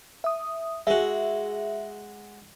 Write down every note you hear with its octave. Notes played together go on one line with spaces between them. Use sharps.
E5 D#6
G#3 F#4 G#4 E5